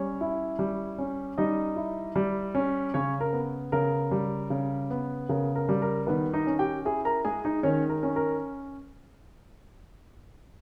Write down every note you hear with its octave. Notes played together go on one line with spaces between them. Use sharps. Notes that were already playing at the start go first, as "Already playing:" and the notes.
Already playing: G3 C#4 C#5
E4
G3
C#4
G3 D#4 D#5
E4
G3
C#4
C#3 C#4 C#5
A#4
B3
C#3 A#4
G3
C#3
B3
C#3 A#4
A#4
G3
A#4
D#3 B3 B4
D#4 D#5
C#4
G4 G5
E4 G#4 G#5
A#4 A#5
G#3 G#4 G#5
D#4 D#5
D#3 C#4 C#5
A#4
C#4
A#4